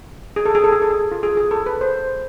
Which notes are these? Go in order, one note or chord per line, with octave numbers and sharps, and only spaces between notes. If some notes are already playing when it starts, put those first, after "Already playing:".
G#4
A4
G#4
A4
G#4
A4
G#4
F4
G#4
G#4
A4
B4
C5